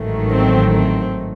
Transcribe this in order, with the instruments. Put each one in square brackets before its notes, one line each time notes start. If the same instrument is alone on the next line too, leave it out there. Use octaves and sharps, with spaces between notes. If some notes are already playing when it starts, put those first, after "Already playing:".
Already playing: [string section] A1 G#2 D#3 F#3 A3
C4
C4